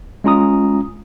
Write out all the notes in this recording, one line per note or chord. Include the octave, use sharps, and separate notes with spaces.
G#3 C#4 F4 A#5 D#6